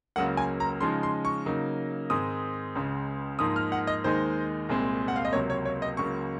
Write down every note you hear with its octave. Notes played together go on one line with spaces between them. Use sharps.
C#2 C#3 F#3 A#3 F#5
G#5
A#5
C#3 F3 G#3 D#4 C6
C6
C#6
C#3 F#3 A#3 D#4
G#2 D#3 G#3 C4 D#6
C#2 C#3 G#3
G#2 F3 A#3 D#4 D#6
F6
F#5
D#5
D#2 D#3 G#3 D#4 C5
C2 A#2 G#3 C4
F#5
F5
D#5
C#2 C3 F#3 A#3 C#5
C#5
C#5
D#5
C#2 C#3 F#3 A#3 C#6